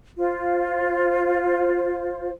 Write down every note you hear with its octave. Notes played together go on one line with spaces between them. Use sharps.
F4 C5